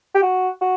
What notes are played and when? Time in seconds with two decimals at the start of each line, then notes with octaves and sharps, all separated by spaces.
0.15 G4
0.22 F#4
0.61 F#4